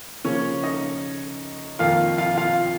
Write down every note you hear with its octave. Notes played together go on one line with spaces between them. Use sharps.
C#3 F3 A#3 C#4 C#5
D#4 D#5
F2 D#3 A#3 D#4 F4 F5
F4 F5
F4 F5